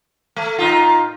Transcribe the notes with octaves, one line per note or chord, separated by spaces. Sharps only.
A3
A2 D#4 F4